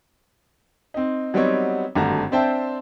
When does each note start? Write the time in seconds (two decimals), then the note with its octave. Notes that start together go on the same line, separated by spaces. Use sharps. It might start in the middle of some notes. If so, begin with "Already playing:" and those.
0.94 C4 D#4
1.34 F#3 G3 B3 C4 D#4 C#5
1.95 G#1 G2 D3 A3 F#4 A#5
2.32 C4 D4 C5 E5 G5 A5